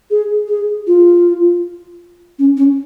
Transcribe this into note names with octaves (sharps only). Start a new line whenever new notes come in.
G#4
G#4
F4
C#4
C#4